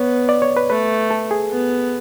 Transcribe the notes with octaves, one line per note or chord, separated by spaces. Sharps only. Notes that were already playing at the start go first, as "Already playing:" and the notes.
Already playing: B3 C#5
D5
C#5
B4
A3 B4
A4
G#4
B3